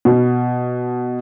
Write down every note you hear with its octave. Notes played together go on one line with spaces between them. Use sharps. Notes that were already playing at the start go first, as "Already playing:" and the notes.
B2